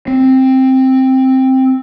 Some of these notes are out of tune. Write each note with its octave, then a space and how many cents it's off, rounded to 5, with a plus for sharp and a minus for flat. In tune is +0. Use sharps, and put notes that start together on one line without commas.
C4 +5